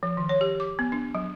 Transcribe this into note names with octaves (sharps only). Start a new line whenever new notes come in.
F3
D#3
C#5
G4
D6
B3
D4
F#3